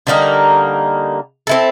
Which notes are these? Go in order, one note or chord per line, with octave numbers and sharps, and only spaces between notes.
D3 G3 A#3 D#4
C4 E4 A4